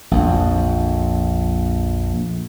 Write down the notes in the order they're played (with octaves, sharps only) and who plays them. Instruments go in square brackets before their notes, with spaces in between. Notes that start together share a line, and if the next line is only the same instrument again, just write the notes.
[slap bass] A#1 F2